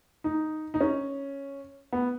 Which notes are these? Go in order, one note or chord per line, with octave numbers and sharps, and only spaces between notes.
D#4
D#4
C#4
B3